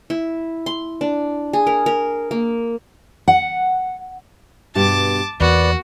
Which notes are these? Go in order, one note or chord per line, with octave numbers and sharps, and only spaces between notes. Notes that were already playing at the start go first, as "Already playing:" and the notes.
E4
C6
D4
G#4
A#4
A#4
A#3
F#5
G2 B2 G4 A5 D6
E2 A#3 F#4 B4 D5